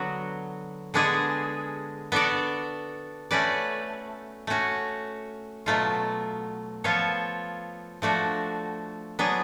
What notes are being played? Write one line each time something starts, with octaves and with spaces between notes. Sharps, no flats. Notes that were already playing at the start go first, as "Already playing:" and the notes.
Already playing: D3 F#3 B3 F#4
D3 G#3 B3 D4 G#4
B3 D4 F#4 A4 D5
A3 C#4 F#4 B4 D5
A3 C#4 F#4
B2 F#3 A3 F4
F3 B3 F4 A4 C#5
F3 A3 D4 F#4
F#3 B3 D4 G#4